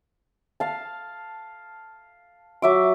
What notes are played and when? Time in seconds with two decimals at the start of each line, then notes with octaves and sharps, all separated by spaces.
0.60 F5 A5
2.62 F#3 E5 D6